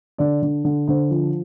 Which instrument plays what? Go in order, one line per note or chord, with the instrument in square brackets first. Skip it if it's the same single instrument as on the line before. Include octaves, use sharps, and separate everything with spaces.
[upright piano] D3 D5
D3
D3
D3 C5
F3